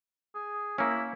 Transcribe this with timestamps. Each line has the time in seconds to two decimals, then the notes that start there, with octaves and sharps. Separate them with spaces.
0.35 G#4
0.78 A#3 C#4 E4